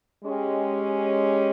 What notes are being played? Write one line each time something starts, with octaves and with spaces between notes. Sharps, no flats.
G#3 C#4 G4